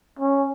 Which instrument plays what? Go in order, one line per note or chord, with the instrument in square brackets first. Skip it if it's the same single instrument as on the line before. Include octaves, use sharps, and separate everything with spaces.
[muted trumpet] C#4